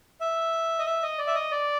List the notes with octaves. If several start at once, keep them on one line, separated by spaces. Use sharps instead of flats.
E5
D#5
E5
D#5
D5
E5
D#5
D5